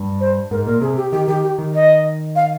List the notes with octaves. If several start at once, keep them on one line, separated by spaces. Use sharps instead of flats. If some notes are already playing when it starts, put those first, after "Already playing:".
Already playing: G2
C5
G#2 A#4
A#2 A#4
C3 G#4
G4
D#3 G4
D#3 G4
G4
D#3
D#5
F5